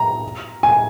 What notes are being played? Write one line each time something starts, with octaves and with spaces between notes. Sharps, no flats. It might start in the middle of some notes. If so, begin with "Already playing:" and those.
Already playing: A#5
G#5